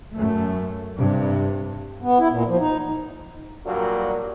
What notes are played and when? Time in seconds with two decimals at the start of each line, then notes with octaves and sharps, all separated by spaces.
0.17 F#2 A3
0.96 G2 C3
2.02 B3
2.19 E4
2.31 A#2
2.48 F3
2.60 D#4
3.65 G2 A#2 F#3 A#3